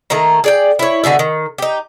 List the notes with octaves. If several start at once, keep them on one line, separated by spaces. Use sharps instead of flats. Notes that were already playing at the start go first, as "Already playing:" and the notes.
D#3 A3 A#3 A#5
G#4 D5 G5
E4 C#5
B2 D3 G#4 E5
D#3
D#4 G4